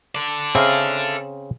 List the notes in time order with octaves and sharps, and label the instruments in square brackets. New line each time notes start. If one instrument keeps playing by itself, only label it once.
[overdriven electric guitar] A4 D5
[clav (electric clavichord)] C#3 C4 [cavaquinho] E5 F5